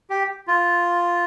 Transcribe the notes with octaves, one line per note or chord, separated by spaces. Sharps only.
G4
F4